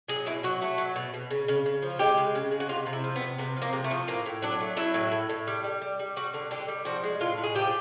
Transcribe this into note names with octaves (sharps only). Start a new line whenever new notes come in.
F#3 G#4
B2 E4
F#3 F#4
A3
F#3
B2
B2
C#3
C#3
C#3
F3
G#3 G4
C#3
C#3
G#3
F#4
C3 F4
C3
E4
F3
B3
C3
C3 B3
F3
A#3
C3
A3
F3
A2 A#3
A2
F#3 D4
A3
F#3 E4
A2
A2
A2
G3
G3
G3
G3
G3 F#4
D3
D3 G4
G3
F3 F#4
G#3
A2 F4
A2
G#4
F3 G4